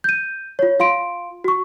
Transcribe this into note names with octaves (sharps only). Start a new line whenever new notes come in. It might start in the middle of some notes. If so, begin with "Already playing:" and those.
G6 D#7
F4 C#5
F4 F5 C6 D7
F#4 C#6